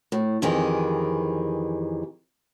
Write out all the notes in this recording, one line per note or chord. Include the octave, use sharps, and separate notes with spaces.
A2
F2 D#3 E3 G4 G#4